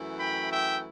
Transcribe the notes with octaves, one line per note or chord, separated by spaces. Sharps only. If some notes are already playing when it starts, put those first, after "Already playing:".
Already playing: F#2 E3 A3 E4
G5 B5
E5 G5